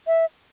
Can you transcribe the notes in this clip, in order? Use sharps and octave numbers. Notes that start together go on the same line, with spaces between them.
E5